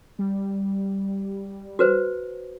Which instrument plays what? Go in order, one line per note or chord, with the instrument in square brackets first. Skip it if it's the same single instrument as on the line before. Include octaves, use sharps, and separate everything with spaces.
[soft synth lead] G3
[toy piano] F#4 B4 C5